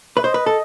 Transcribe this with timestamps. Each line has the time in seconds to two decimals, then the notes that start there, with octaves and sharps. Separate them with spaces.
0.17 B4 E5
0.23 C5 D#5
0.34 B4
0.46 A4